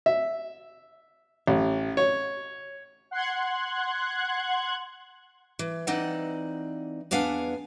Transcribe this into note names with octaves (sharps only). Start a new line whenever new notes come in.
E5
A1
C#5
F#5 C6 F#6 G#6
E3
E3 C4 D#4 D5 F#5
E2 B3 D4 F5 F#5 G#5